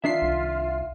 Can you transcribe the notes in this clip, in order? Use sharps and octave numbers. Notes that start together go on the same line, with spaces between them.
D#3 D4 F4 E5 C7
C2